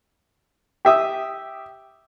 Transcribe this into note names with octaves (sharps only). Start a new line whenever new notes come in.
G4 E5 D#6